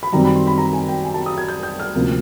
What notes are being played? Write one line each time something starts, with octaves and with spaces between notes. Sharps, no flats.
B5
F#2 D#3 G3 C4 A#5
B5
C6
B5
A#5
G#5
G5
G#5
A5
D#6
G#6
G6
G6
F6
D2 C3 F3 A#3 C#4